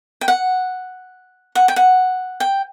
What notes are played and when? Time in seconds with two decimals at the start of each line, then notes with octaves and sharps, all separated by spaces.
0.21 G5
0.28 F#5
1.55 F#5
1.68 G5
1.76 F#5
2.40 G5